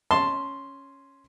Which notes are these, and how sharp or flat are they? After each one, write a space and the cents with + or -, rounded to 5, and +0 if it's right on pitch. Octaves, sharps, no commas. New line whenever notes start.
C#4 +0 A5 +0 C6 +0